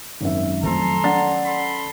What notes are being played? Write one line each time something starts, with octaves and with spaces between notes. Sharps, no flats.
G#1 F#2 E5
F2 D#3 F#3 A3 A4 A#5 C6
C#4 D5 F#5 A6
A4 B5 C6